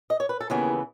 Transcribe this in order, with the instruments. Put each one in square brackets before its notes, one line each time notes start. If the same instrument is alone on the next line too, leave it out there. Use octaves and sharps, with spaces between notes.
[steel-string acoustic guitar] D#5
C#5
B4
A4
D#2 C#3 E3 B3 E4 G#4